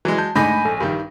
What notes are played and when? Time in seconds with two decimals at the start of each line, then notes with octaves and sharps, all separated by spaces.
0.05 E3 F#3 G#3
0.18 A5 G6
0.36 G#2 D3 A3 D#4 G#5 B5 G6 A#6
0.65 A#1 A4
0.80 G2 D#3 G4